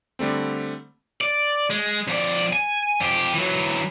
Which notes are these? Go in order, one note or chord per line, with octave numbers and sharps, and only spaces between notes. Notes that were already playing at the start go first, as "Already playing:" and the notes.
D3 G3 A3 C4
D5
G#3
F2 D5
G#5
F2 G4
E3 F#3